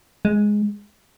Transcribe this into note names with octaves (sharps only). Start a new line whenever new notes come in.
G#3